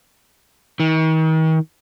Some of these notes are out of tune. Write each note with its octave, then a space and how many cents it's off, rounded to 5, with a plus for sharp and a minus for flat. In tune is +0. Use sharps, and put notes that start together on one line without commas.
D#3 +40